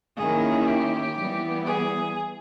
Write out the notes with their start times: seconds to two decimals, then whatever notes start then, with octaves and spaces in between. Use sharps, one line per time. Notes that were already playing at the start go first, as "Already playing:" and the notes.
0.17 D#3 A#3 C#4 E4 G#4
0.66 G4
1.16 E3 G3 B3
1.66 G#4